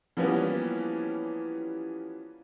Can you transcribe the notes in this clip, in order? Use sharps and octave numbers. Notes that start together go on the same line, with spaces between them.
E3 F3 G3 A#3 B3 C#4